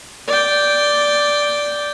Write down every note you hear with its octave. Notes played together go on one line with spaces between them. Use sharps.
D5 G5